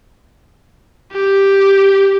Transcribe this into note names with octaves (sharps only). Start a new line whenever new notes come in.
G4